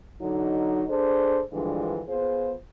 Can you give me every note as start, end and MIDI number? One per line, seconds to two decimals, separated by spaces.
0.20 0.83 50
0.20 0.83 54
0.20 0.83 63
0.88 1.40 62
0.88 1.40 68
0.88 1.40 69
0.88 1.40 72
1.52 1.99 43
1.52 1.99 50
1.52 1.99 52
1.52 1.99 53
1.52 1.99 56
2.07 2.52 59
2.07 2.52 65
2.07 2.52 68
2.07 2.52 72